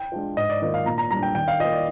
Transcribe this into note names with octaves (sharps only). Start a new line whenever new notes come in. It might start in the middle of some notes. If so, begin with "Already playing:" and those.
Already playing: G5
G#3 D4 F4
G#2 D#5
D5
D#3 A#3 F4 D#5
F5
A#2 A#5
A#5
G3 D4 A#5
G5
D#3 G5
F5
A#3 F4 D#5
D5